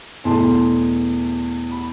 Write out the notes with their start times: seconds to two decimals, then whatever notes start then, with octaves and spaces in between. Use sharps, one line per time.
0.24 E2 B2 A3 A5 C6
1.71 B5